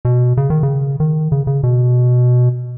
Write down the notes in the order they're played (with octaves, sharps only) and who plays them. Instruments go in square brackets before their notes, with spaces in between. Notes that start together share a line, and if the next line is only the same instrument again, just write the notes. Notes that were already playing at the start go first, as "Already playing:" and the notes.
[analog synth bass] B2
C#3
D#3
C#3
D#3
C#3
C#3
B2